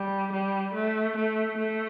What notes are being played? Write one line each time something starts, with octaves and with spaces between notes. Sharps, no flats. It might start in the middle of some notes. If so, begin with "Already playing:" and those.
Already playing: G3
G3
A3
A3
A3